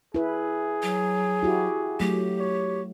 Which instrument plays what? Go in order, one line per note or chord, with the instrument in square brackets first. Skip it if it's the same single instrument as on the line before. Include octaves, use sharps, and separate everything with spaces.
[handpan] E4 B4 [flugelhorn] G#4
[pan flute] F#3
[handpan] E4 F#4 G4
[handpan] F#3 A3 [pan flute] G4
[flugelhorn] C#5